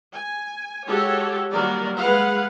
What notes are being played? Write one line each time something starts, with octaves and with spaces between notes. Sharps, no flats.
G#5
G#3 F#4 G4 A4 C#5
D#3 F#3 G3 A#3 A#4 D5
G#3 B4 F5 F#5